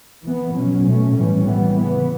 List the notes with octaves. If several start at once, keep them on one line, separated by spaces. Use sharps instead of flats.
E3 B3
B2 F#3 C#4
B2 A3 C#4
A2 E3 G3 C#4
E3 G3 B3
C#3 E3 B3